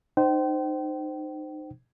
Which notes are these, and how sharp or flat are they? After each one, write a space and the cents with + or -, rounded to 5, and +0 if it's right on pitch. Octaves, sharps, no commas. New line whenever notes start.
D#4 -25 C5 -10 G5 -35